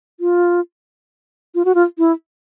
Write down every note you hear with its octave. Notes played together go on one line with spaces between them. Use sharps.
F4
F4
F#4
F4
E4